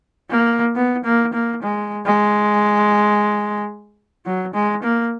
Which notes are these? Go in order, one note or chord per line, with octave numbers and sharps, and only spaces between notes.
A#3
B3
A#3
A#3
G#3
G#3
F#3
G#3
A#3